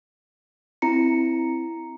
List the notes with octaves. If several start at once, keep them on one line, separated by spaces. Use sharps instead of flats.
C4 E4 A#5 C#7